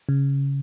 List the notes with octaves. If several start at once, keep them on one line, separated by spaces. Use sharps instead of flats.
C#3